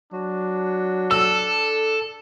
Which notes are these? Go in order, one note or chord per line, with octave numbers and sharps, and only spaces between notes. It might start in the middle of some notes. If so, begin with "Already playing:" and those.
F#3 D4
A4 E6